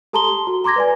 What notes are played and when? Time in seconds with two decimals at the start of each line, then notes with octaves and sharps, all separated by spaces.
0.13 G4 A4 A5 A#5 C6 G7
0.47 F#4
0.64 A#5 C6 D6 G#6 A#6
0.76 B4 D5 G#5